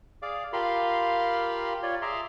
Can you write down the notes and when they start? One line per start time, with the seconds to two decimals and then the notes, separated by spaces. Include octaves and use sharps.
0.22 G#4 D5 F5 D6
0.53 F4 G4 A#4 F5 B5 C6
1.83 F4 C#5 D5
2.02 G#4 E5 A#5 C6 D6